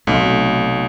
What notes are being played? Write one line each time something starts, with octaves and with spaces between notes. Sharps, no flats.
B1 C3 A3